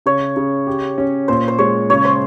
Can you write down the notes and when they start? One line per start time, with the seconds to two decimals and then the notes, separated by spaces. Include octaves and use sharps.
0.06 C#3 C#5
0.37 C#3
0.67 G4
0.98 C#4
1.28 A#2 C5
1.48 C5
1.58 G#3 C#5
1.90 C#3 C#5
2.05 C5